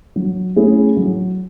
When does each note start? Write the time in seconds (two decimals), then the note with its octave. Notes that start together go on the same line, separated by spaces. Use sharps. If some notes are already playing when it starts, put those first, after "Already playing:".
0.16 F#3
0.56 A3 C#4 E4 G#4
0.97 F#3